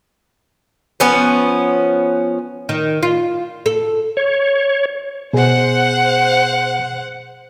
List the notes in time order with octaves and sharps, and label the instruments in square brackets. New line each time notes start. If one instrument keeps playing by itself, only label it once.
[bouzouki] F3 B3 C#4 B4
[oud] D#3
F4
A4
[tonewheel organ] C#5
[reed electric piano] B2 G#4 [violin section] C5 F#5